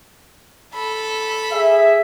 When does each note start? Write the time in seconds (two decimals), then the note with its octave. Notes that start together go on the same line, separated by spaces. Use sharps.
0.74 A4 B5
1.52 G#4 E5